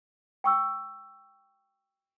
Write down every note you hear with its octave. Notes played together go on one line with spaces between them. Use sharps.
G5 C#6 E6